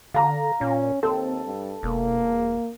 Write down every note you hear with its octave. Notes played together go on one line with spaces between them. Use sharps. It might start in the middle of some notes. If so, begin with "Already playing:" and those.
D3 F5 A#5
A#2 C#4
D#2 C4 A4
G2
E1 A#3